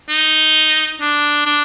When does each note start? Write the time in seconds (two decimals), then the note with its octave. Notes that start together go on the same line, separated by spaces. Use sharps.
0.09 D#4
1.01 D4
1.46 D4